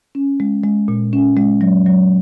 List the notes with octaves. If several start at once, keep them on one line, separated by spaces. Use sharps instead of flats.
C#4
G#3
G#3
A#2
C#4
G#3
F#3
F#3